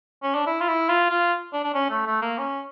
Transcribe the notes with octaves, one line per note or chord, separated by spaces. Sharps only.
C#4
D4
E4
F4
E4
F4
F4
D4
D4
C#4
A3
A3
A#3
C#4